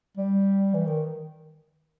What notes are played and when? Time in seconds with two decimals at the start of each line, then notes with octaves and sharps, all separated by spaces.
0.17 G3
0.74 E3
0.87 D#3